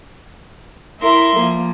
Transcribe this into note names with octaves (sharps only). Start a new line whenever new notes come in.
E4 A#4 E5 C6
F3 A#3